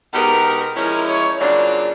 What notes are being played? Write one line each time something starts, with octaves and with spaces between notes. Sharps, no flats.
B2 G#3 B3 D#4 G4 A#4
F3 G#3 C#4 E4 A#4
C#5
C#3 F#3 A#3 D4 F4 D5